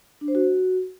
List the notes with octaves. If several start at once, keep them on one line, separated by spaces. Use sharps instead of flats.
D4
C5
F#4